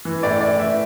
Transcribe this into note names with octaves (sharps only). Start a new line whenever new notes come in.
E3
A2 D5
A2 D5
E3 E5